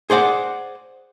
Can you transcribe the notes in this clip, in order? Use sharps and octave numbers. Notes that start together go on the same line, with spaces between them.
G#4 C5 D5 F#5